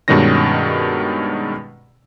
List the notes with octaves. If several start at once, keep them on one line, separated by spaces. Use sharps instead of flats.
G2 B2 D#3 G#3 C#4 A#6